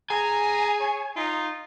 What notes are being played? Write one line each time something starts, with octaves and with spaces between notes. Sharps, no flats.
G#4 G#5 A#5
C#5
D#4 F4